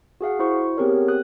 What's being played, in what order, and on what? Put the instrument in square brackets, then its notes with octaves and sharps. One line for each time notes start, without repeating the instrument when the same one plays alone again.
[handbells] F#4 G#4 F5 F#5
E4 F#4 C5 C#6
B3 C4 G4 G#4 A#4 C#5
D#6 F#6